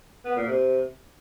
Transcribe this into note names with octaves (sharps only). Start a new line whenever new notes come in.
B3
A#2
C3